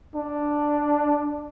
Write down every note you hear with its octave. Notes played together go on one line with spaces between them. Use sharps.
D4